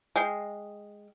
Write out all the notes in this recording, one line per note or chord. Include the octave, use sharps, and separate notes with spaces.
G#3 F5 G5